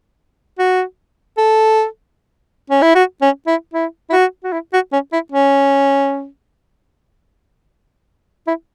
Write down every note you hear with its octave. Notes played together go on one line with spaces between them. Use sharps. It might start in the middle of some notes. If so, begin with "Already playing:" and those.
F#4
A4
C#4
E4
F#4
C#4
E4
E4
E4
F#4
F#4
E4
F#4
C#4
E4
C#4
E4